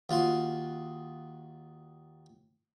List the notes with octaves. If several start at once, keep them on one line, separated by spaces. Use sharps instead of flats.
D#2 F4 F#4 C6